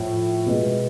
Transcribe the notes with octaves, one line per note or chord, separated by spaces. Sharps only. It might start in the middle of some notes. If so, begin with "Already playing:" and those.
Already playing: A2 F3 A3
B2 G#3 B3